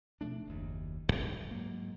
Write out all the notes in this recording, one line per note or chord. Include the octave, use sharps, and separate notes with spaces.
B2 F3 A3 D4
F#1 D#2
D1 G1
G#2 F#3 A#3